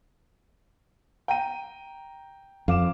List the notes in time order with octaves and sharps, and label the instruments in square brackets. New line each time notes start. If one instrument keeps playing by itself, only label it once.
[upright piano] G5 A#5 D#7
[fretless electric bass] F2 [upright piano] F5 D6 E7